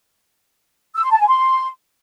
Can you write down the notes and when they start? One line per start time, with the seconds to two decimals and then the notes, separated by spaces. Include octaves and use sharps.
0.95 E6
1.03 C6
1.11 A5
1.19 G#5
1.27 C6